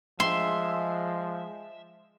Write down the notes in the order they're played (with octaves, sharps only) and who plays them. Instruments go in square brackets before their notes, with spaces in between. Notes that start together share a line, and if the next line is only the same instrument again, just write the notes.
[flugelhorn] F3 [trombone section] G#3 [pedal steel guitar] E5 [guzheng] C6